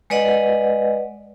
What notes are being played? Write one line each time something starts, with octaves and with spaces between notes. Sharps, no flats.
G#3 B4 D5 D#5 F#5